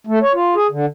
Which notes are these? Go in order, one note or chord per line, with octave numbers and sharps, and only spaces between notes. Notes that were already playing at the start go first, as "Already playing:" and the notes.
A3
C#5
F4
G#4
D3